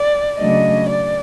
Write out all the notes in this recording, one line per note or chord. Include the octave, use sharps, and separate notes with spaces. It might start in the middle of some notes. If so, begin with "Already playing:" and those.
Already playing: D5
C#3 F#3 A3 D4 D#5
D5